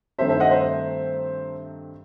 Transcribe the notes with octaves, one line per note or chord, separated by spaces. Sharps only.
G2 D#3 A3 C4 D#4 C5 E5
C5 E5
D#5 F#5
C5 E5